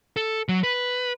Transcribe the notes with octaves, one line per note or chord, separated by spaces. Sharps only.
A4
F#3
B4